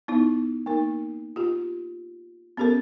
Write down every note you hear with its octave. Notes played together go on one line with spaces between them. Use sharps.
B3 D#4 E4
A#3 D#4 A#4
F4 G4
B3 C#4 G4 A4 A#4